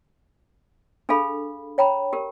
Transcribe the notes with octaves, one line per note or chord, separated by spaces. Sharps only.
D4 G#4 A4 F5 B5
C#5 G5 A#5 B5
G4 A#4